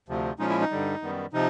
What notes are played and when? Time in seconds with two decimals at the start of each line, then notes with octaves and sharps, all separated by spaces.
0.09 D2 C3 F3
0.39 A#2 F3 G#3 C#4 D#4
0.49 E4
0.60 D#4
0.71 G2 D3 G3
1.02 F#2 D#3 G3 B3
1.33 C3 F3 D#4